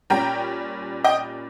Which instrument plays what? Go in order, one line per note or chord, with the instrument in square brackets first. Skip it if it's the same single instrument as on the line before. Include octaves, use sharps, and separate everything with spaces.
[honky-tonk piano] A#2 G3 C#4 G5 A#5
D#5 G5